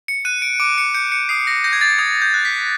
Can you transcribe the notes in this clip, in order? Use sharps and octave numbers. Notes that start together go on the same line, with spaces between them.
C#7
F#6 D#7
D7
D6 D7
C#7
G6 C#7
C#7
D#6 C7
A#6
G6 A#6
G#6
A6
D#6 G#6
G6
F#6
B6